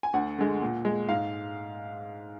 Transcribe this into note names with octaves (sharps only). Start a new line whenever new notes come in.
G#5
D2 F#5
D3 G#3
A#2
G#3
G#2 F5